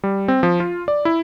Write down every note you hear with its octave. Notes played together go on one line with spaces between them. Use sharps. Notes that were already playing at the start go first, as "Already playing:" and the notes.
G3
C4
F3
F4
D5
E4